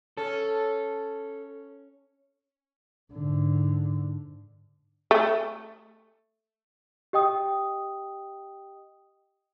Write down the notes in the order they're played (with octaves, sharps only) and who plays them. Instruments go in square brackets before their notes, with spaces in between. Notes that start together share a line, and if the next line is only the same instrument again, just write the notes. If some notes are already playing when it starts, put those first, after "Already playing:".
[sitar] C#4 [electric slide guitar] A4
[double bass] G#2 D3
[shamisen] A3
[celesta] G4 D#5 G5 D#6